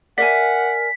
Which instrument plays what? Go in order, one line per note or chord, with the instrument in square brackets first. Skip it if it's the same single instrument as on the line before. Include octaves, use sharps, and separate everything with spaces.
[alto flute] A#4 [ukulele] D5 E5 G#5 [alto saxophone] F#5 [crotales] B6